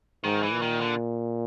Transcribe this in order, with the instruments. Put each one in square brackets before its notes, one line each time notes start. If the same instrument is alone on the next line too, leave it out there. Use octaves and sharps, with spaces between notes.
[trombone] G#2 [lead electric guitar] D#3
[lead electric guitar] E3
[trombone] A#2
[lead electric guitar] D#3
D3